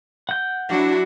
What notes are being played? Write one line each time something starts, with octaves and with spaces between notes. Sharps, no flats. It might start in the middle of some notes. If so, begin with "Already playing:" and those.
F#5 G6
F#3 D4 E4 F#4